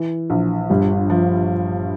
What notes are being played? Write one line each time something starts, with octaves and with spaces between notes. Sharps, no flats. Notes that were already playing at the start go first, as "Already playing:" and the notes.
Already playing: E3
A#1
G1 G3
F3